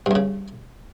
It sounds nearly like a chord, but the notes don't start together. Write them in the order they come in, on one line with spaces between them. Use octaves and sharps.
G2 E2 C#3